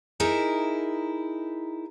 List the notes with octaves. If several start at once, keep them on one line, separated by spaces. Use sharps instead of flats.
D#4 E4 G#4 A#4 E5